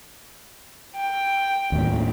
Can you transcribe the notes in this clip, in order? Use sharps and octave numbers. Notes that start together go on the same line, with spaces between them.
G5
D#2 A2